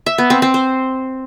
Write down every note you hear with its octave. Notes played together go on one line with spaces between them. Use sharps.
E5
B3
C4
C4
C5